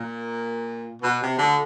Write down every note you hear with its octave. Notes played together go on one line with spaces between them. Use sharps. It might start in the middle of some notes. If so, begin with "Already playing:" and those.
Already playing: A#2
B2
C3
D2 D3